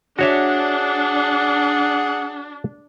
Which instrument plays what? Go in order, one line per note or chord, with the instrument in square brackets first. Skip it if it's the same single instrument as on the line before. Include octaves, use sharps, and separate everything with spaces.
[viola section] D4 [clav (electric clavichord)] F#4 C#5 E5 [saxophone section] G#4 F#5